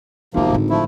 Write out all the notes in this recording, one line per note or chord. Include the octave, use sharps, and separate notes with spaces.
G#1 E2 C3 F3 A#3 B3
A2 D3
F3 A3 E4